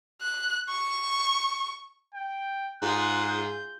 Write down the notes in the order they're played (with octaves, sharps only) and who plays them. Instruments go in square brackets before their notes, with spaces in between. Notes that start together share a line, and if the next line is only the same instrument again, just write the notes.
[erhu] F#6
C#6
[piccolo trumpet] G5
[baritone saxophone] G#2 [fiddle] F4 G#4 [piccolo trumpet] F#6
[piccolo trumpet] G6